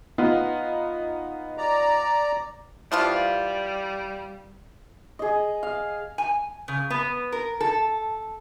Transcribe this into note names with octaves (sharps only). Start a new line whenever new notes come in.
B3 D#4 F4
D5 A#5
E3 F3 G3 F4
G#4 D#5
F5
G#5
C#3
B3
A#4
A4